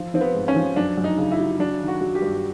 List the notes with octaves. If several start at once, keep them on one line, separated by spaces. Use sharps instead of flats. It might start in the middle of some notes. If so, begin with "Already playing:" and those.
Already playing: F3
F3 C4
B3
G#2
C#4
F3
F#2 D4
F#2
D#4
C#3
E4
F#3
F#3 D4
D#3
F#4
F#3
G4
G2